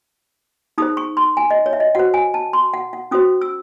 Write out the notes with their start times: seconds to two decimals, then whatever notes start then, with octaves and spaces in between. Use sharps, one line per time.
0.78 D#4 G#4 C5 D#6
0.97 C#6
1.17 C6
1.37 G#5
1.51 D#5
1.66 C#5
1.73 E5
1.80 D#5
1.95 F#4 C5 F#5
2.14 G#5
2.34 A5
2.53 C6
2.73 F#5
2.93 F#5
3.11 C#4 F#4 C5 D#6
3.41 E6